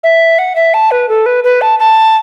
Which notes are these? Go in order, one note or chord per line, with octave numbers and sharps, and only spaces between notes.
E5
F#5
E5
A5
B4
A4
B4
B4
A5
A5